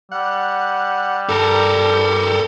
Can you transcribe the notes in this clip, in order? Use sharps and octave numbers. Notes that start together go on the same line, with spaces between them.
G3 F#5
G2 A4 A#4